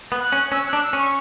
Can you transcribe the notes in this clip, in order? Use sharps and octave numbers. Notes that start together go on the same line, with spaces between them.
B3
F#6
C#4
C#4 E6
F#6
D4
E6
C#4
C#6